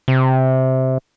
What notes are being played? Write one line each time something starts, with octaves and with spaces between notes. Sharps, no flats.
C3